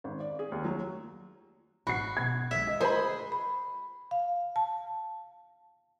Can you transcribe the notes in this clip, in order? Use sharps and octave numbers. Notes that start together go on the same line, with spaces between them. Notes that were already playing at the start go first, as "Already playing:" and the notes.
G#1
D5
G#4
D#2
F#3
G#1 F#4 B5 C7
B2 G#6
D3 G#3 E5
D#5
G#4 C5 B5
B5
F5
A5